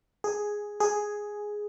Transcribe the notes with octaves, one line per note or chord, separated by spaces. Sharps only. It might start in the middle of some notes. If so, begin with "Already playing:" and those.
G#4
G#4